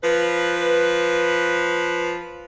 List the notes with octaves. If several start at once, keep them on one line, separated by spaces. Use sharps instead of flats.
F3 B4